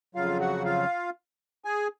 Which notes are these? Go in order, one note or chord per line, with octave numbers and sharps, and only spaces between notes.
F2 C#3 F#3 F4 F5
F#4 F#5
F4 F5
G#4 G#5